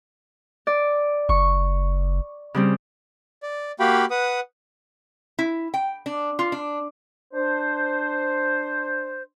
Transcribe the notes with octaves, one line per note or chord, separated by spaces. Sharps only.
D5
F#1 C#6
C#3 G3 C4
D5
A#3 F#4 G4 F5 G5 B5
B4 F#5 D#6
E4
G5
D4
F4
D4
D4 C5